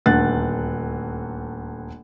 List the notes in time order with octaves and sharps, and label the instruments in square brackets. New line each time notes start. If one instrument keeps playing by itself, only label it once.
[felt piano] D#1 D2 F#6 A6